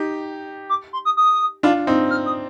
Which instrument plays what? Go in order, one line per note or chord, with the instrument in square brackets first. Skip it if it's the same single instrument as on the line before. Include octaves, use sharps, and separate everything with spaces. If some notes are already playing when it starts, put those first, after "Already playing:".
Already playing: [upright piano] D#4 G4
[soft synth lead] D6
C6
D#6
D#6
[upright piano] D4 F4
C4 D#4
[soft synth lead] F6
D#6